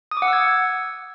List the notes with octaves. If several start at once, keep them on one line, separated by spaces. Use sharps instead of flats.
D#6
D6
F#5
E6
G#6